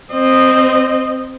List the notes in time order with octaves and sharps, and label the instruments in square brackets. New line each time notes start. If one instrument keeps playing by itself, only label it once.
[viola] C4 D#5